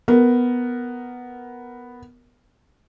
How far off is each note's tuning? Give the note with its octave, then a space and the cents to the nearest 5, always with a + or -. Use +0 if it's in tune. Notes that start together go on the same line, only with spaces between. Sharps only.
B3 +0 A#4 +0